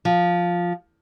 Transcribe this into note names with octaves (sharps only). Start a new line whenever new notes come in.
F3